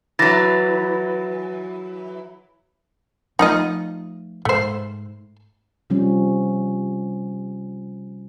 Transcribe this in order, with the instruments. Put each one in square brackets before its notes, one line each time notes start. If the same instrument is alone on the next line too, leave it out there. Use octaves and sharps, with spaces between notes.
[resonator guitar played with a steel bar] E3 F#3 [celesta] A6 A#6
[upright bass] F3 A3 [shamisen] D#4 F4 D#5
[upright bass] G#2 [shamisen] A3 C5
[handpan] C3 F3 G3 C#4